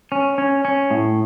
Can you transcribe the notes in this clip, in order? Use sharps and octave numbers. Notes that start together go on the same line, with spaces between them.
C#4
C#4
C#4
A2